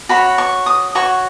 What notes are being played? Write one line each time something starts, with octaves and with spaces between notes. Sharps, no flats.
F#4 C#5 B5
C#6
D#6
F#4 C#5 C#6